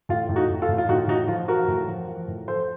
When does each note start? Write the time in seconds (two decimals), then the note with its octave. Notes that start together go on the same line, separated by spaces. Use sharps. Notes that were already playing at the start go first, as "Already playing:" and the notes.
0.09 A2 F4
0.29 A2
0.36 D#4 F#4
0.50 A2
0.62 F4 A4
0.69 A2
0.78 F4
0.89 A2 D#4 F#4
1.08 A2 D#4 F#4
1.28 F3 F4
1.48 F3 F#4 A#4
1.68 A2
1.87 F3
2.08 F3
2.28 A2
2.47 F3 A4 C5